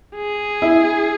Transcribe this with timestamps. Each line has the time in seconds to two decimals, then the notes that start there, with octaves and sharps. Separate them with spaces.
0.16 G#4
0.62 E4